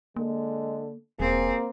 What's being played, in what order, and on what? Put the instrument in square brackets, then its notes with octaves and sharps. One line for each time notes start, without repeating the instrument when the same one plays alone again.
[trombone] D3 [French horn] G#3 [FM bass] A#3
[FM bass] E1 [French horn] A#3 [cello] C4 [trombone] G#4